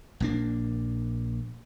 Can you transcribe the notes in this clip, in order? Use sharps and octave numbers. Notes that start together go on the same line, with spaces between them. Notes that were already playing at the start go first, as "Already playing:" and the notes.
A#1 A#3 D4